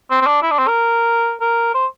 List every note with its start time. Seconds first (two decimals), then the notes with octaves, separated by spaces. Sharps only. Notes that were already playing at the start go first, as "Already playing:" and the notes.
0.10 C4
0.21 C4
0.27 D4
0.42 E4
0.51 D4
0.59 C4
0.68 A#4
1.41 A#4
1.74 C5